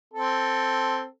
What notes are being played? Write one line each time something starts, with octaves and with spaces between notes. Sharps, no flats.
C4 A4